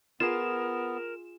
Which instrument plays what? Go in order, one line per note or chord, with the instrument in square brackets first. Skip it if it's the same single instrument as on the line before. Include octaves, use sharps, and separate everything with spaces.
[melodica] B3 [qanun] F4 G#4 [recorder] A#4 [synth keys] E7